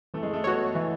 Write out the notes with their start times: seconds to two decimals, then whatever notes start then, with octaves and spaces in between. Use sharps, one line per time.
0.14 E3 A3
0.23 G#3
0.33 A3
0.44 B3 F#4 C#5
0.75 E3